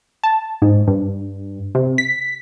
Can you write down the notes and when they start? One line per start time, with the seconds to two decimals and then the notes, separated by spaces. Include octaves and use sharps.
0.24 A5
0.62 G#2
0.87 G2
1.75 C3
1.98 B6